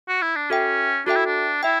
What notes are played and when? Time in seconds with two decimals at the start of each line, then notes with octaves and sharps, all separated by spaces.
0.09 F#4
0.22 E4
0.36 D4
0.50 C#4 F#4 A4 E5 G5
1.06 D4 F#4 A4 E5 G5
1.16 E4
1.26 D4
1.63 E4 E5 G5